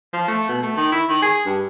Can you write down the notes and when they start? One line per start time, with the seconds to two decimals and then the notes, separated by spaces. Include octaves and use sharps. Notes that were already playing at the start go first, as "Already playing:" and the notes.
0.13 F3
0.28 A3
0.49 B2
0.62 A3
0.77 D#3
0.92 E4
1.09 D#3
1.22 G#4
1.46 G2